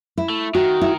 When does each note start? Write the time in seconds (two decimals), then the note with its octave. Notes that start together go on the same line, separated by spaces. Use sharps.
0.18 E4
0.30 A3
0.55 D#3 F#4
0.81 E4